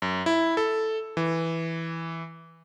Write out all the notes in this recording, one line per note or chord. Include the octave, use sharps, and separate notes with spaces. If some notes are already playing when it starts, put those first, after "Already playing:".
F#2
E4
A4
E3